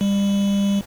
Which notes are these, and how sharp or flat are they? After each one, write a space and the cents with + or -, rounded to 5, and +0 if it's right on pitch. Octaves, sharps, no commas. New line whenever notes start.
G3 +30